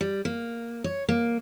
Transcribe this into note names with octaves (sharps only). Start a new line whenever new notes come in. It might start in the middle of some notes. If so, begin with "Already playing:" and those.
G3
A#3
C#5
A#3